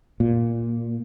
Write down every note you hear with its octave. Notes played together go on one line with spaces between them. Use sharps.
A#2